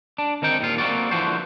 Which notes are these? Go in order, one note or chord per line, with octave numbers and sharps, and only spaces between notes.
D4
D#3 C4 D#4 G5
D#2 A#2 F4
A#3 C4 F#4 D5
D3 E3 F3 F#4 C5